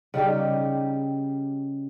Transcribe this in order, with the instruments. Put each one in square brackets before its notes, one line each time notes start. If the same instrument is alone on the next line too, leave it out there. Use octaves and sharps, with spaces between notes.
[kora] C#3 G3 D#4 G4